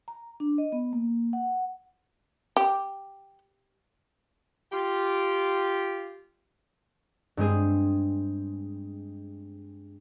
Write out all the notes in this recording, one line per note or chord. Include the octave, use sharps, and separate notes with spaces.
A#5
D4
D#5
B3
A#3
F#5
G4
F4 G4
G2 G#3 C4 G#4